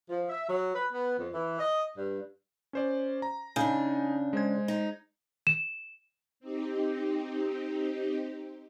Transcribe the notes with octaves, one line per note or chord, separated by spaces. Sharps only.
F3
E5
F#3
B4
B3
F2
E3
D#5
G2
C#4 C5 D5
A#5
C#3 D4 D#4 G#5 G6
G#3 C5 G#6
D#4
E7
C4 D#4 G4